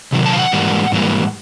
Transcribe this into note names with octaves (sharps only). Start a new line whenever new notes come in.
C3 D#3 F#3
A5
F5
F#5
G#2 E3 G3 A#3
G#2 E3 G3 A#3